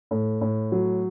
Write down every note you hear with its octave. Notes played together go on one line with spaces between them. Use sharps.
A2
A2
F#3